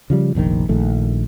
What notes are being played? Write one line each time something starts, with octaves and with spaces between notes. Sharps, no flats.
C#3 F3 G3
F1 A#1 A2 D#3
A#1 D#3 A3